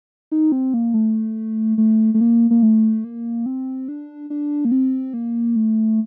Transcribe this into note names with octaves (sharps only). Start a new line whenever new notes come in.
D#4
C4
A#3
A3
A3
A3
A#3
A#3
A3
A#3
C4
D4
D4
A#3
C4
A#3
A3